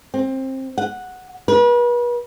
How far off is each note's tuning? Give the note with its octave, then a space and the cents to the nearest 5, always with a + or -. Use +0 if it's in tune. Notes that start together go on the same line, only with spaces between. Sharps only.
C4 +20
F#5 -5
B4 -40